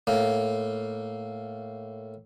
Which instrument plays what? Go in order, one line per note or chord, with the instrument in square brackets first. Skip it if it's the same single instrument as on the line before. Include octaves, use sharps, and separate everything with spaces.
[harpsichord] A2 A#3